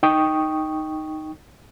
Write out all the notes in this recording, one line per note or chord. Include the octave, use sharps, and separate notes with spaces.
D#4 G5 C#6 D#6